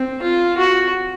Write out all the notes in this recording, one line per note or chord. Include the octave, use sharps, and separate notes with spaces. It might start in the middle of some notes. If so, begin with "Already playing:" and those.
Already playing: C4
F4
F#4